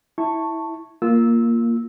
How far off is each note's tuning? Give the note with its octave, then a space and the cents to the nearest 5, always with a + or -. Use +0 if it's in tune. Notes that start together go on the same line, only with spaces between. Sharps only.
E4 -10 A5 +15 C#6 -5
A#3 +0 F4 -10 E6 -15